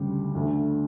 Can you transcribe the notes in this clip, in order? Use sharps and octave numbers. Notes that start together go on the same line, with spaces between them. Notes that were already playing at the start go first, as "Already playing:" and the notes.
Already playing: D2 C#3 G3
D2 D3 A3